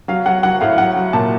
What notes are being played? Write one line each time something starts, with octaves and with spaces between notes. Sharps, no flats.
F#3 F5
F#3 F#5
F#3 F#5
A2 F5
F#3 F#5
F#3
A#2 A5